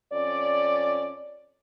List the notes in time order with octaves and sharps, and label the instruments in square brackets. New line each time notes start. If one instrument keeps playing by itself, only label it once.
[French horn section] F2 C#4 D5